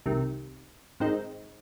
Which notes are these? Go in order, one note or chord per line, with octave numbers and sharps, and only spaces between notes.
C2 C3 D#3
G#2 D#3 G#3 C4 D#4